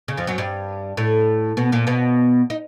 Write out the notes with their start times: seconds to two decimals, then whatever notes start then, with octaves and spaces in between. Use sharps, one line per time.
0.08 C#3
0.17 F2 F3
0.27 F#2 F#3
0.38 G2 G3
0.97 A2 A3
1.57 B2 B3
1.72 A#2 A#3
1.87 B2 B3
2.50 D#4